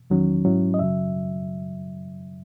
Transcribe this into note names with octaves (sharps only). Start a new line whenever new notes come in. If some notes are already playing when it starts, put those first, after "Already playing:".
E2 D#3 F#3 C#4
G#2 F#3 C#4 E4
D#5
F#2 C#3 F#3 E5